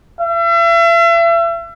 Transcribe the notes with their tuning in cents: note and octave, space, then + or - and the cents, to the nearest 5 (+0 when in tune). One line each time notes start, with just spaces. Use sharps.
E5 +40